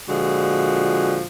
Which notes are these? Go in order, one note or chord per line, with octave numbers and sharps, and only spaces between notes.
A#2 D3 F3 G#3 F#4